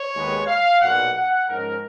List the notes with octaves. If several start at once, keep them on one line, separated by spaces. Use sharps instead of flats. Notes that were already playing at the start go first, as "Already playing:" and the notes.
Already playing: C#5
D#2 D#3 G#3 B3
F5
B1 A#2 F#3 F#5
F#5
G#2 F3 G#3 C#4 A#4